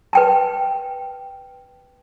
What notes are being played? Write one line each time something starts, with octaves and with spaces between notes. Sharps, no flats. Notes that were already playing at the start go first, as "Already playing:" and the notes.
B4 G5 A5